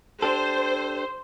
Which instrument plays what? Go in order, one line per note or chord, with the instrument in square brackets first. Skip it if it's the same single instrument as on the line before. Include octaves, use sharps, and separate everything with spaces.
[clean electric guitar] D4 G4 A4 [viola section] C5